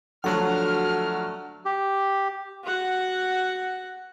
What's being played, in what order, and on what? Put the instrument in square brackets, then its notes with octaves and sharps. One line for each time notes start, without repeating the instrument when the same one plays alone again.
[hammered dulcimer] D3 A3 [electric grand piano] F3 F#3 [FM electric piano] F#4 F#5 [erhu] F6
[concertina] G4
[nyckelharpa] F#4 F#5